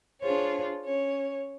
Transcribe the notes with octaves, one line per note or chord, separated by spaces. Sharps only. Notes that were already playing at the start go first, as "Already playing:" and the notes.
D4 F4 G#4 C5 C#5
C#4 C#5